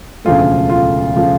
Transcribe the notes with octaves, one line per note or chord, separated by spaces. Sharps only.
E1 D2 C#3 F3 A3 F4
F4
C#3 F3 A3